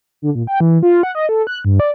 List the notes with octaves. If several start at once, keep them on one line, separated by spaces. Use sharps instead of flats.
D3
A#2
G5
E3
F4
F#5
D#5
A4
F#6
G2
D5